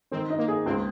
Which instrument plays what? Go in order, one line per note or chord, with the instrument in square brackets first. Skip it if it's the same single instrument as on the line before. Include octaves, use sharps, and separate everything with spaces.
[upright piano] D#3 [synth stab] C4
[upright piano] D#4
[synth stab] A#3
[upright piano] G#4
[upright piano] C#2 [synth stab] C4